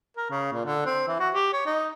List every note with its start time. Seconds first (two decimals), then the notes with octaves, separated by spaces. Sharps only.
0.17 A#4
0.31 C#3
0.53 A#2
0.66 D3
0.86 C4
1.08 E3
1.20 F#4
1.34 G4
1.53 C#5
1.66 D#4